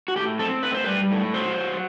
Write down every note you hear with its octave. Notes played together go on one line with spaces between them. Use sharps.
F#4
A2 G4
C4 A4
A2 B4
C5
G3 B4
A2
F#3 C5
F#3